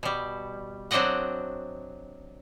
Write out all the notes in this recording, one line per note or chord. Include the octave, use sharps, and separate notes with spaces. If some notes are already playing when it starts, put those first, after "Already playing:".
B2 G3
F#3 C4 D4 D5 D#5 F#5